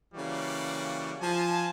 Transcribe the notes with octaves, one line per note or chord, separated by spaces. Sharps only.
C#3 E3 G3 A#3 F#4 D5
F3 G#5 A5